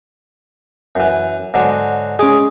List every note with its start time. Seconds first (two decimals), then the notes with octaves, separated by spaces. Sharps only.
0.95 F#2 E3
1.54 G#2 D3 F#3
2.19 G#3 C#4 G#4 D6